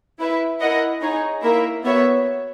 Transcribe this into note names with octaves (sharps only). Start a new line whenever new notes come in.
E4 B4 E5
E4 A#4 D#5 F#5
D#4 G#4 C#5
A#3 E4 A#4 E5
B3 F#4 C#5 E5